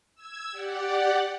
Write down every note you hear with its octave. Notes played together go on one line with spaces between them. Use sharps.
E6 G#6
G4 D5 F#5